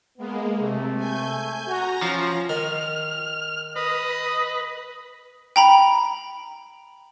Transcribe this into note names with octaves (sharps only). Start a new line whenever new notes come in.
G#3 A#3 B3
C3 A3
G#5 G6
F#4 A#5 A#6
F3 C#4
D#3 F6
B4 D#5
G5 A#5 B5